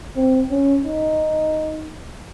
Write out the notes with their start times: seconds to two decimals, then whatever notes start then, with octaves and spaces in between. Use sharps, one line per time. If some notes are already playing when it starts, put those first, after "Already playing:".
0.16 C4
0.51 C#4
0.85 D#4